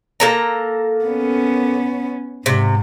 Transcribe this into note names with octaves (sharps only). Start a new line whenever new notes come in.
A#3 A4 A#5
B3 C#4
G#2 C3